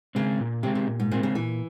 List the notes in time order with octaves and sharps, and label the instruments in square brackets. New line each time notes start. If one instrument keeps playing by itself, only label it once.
[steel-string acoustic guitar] C#3 [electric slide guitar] G#3 C4
[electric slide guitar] A#2
[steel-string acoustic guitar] C3 [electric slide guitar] G#3 C4
[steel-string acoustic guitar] C3
[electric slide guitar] A#2
[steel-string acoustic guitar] G#2
[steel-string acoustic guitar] A#2 [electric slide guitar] G#3 C4
[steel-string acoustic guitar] C#3
[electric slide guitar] A#2 [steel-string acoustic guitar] E3